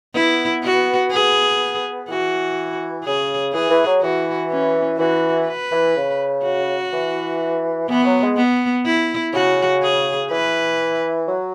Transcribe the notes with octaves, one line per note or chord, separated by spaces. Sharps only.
B3 E4
F#4
B3 G#4
E3 F#4
C#3 G#4
E3 G#4
E3
F#3
E3 F#4
C#4
E3 F#4
B4
E3
C#3
F#4
E3
E3 B3
F#3
G#3
B3
E4
C#3 F#4
G#4
E3 B4
F#3